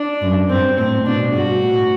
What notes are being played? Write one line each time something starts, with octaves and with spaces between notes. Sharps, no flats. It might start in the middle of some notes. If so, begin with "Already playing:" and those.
Already playing: D4
F#2
G2 C4
A2 C4
B2 D4
G2 F#4
A2